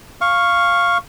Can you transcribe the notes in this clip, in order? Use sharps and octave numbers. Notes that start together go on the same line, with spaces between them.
F5 C#6